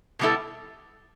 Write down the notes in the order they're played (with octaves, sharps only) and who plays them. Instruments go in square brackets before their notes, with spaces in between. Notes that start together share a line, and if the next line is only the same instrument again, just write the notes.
[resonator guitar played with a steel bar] B2 G3 B3 E4 A4